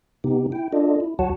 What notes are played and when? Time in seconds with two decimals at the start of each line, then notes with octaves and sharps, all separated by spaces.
0.24 C3 B3 D#4 G4
0.52 E4 G5
0.73 D4 F4 A4 D5 D#5
1.00 E4
1.19 D2 F#3 F#4 C#5 F#5 A5